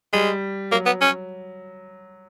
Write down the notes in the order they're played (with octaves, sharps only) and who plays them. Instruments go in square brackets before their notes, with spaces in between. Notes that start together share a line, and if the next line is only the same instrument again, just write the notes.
[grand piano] G3 [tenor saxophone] G#3
[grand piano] F#3 [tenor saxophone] A#3
[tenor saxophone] B3
C#4